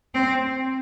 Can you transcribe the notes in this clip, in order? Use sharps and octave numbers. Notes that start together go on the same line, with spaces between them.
C4